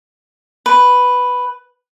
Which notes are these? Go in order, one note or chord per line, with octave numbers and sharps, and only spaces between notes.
B4